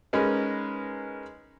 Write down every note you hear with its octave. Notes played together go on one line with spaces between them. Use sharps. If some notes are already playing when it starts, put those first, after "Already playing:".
G#3 C#4 D#4 A#4 B4